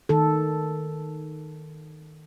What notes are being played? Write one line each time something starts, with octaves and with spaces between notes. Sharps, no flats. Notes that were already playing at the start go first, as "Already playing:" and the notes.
D#3 A4